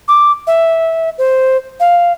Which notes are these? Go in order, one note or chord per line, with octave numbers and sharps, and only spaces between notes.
D6
E5
C5
F5